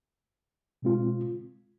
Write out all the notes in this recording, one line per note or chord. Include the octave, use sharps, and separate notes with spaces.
B2 G#3 C4 F4